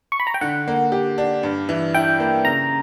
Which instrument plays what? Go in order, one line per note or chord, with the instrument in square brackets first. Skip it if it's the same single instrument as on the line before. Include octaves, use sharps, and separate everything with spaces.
[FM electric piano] C#6
B5
A#5
G5
[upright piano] D3 [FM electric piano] F#5
[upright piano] A#3
G4
D4
G2
E3
[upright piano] E4 [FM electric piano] G5
[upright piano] A#3
[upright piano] C#3 [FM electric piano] A#5